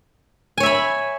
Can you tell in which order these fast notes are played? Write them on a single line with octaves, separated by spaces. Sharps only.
G#5 C#5 E5 B5